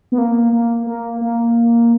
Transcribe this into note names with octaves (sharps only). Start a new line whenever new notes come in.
B3
A#3
A#3
A#3
A#3